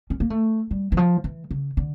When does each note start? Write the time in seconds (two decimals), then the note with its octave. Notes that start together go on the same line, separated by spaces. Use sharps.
0.10 C#4
0.20 A#3
0.30 A3
0.71 G3
0.92 E3
0.97 F3
1.24 E3
1.51 C#3
1.77 D3